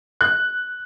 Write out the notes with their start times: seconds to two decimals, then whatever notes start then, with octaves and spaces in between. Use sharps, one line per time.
0.21 F#6